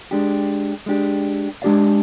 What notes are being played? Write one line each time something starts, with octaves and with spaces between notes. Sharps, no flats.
G#3 D4 G4
G#3 D4 G4
G#3 D4 G4 D5 F5